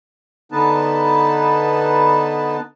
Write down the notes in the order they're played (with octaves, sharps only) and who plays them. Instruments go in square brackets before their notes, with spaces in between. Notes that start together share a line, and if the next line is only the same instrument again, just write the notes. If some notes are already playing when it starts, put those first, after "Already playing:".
[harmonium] D3 B3 D#4 B4 A5